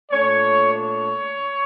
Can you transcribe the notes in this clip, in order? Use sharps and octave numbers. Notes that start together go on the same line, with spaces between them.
A#2 A3 D4 C#5
C#5